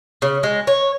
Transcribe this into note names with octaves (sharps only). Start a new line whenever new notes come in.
C#3
G#3
C#5